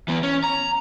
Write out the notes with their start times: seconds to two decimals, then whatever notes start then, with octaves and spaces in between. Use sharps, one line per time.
0.08 E3 B3
0.23 C#4
0.44 A#5